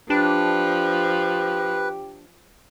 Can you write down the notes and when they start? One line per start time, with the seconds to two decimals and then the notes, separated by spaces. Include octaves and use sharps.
0.10 F3 D4 G4 B4